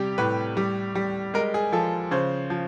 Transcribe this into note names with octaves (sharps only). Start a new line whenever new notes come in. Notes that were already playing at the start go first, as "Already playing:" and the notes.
Already playing: C3 G3 G4
A2 B4
G3
G3
G#3 A#4
G#4
F3 A4
C#3 C5
F3